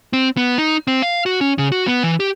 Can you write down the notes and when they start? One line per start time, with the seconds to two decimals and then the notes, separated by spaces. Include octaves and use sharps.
0.13 C4
0.37 B3
0.58 D#4
0.87 C4
1.02 F5
1.26 F#4
1.41 C#4
1.58 C#3
1.72 F#4
1.88 B3
2.03 E3
2.20 G4